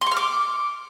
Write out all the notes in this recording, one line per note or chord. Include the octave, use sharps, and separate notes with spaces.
C6
C#6
F6
D6